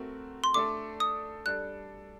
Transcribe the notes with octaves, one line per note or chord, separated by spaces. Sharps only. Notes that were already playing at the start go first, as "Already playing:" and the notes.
Already playing: A3 C4 F#4 A#4
C6
A3 D4 A4 D5 D6
D#6
G3 D4 A4 D5 F#6